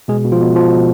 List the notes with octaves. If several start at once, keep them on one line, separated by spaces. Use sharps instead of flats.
B2 G#3 G#4
B2
F3 F4
B2
B2 F3 F4
B2